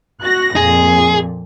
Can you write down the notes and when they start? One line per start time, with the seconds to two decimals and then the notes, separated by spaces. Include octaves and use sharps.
0.21 F#4 F#6 A#6
0.56 F2 A#2 G#4